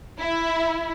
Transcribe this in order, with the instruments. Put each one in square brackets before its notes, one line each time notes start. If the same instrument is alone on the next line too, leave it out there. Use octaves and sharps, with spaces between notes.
[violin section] E4